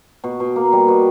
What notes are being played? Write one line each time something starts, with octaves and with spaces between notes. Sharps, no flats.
B2
B2
A#3
G3
B2